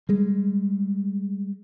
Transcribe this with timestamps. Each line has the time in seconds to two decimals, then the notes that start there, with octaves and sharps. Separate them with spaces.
0.09 G3 G#3